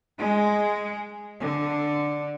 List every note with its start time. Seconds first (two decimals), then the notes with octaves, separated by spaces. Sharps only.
0.19 G#3
1.42 D3